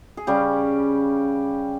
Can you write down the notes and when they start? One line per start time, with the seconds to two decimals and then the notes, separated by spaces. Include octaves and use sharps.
0.17 G#4
0.27 C#3 G3 C#4 G4